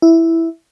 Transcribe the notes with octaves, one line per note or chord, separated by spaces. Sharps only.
E4